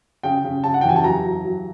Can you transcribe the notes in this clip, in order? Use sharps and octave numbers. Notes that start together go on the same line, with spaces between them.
C#3 G5
C#3
C#3 A5
F#5
G5
E3 G#5
A5
F#3 A#5
F#3
F#3